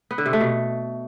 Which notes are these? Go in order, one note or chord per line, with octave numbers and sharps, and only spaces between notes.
B3
D3
C3
A3
B2